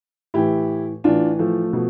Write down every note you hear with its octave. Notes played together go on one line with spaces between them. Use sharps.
A2 E3 E4 G4
A2 E3 D4 F4
F3 A3
B2